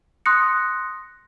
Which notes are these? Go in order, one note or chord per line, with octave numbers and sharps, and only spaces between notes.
C6 D#6 F#6 A#6 C#7